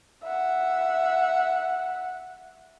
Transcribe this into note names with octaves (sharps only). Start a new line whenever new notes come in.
E5 F#5